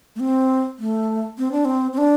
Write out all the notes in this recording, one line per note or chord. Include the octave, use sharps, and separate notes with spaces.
A3
C4
A3
C4
D4
C4
C4
D4